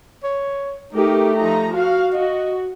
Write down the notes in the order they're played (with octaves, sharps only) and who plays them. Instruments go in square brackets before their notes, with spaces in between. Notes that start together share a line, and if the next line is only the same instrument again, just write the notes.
[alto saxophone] C#5
[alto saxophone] A3 [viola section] D#4 G4 A#4
[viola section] F3 D#4 A#5
F#4 F5
[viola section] F#4 [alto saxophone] D#5